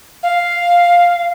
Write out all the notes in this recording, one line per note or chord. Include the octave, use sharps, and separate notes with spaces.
F5